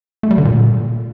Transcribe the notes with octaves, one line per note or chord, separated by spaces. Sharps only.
A3
G3
D3
A#2